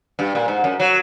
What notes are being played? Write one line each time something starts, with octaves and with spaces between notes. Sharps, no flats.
G2
A#2
G#2
F#2
F#3